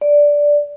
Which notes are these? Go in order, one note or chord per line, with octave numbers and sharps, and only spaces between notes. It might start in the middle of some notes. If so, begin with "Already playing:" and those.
D5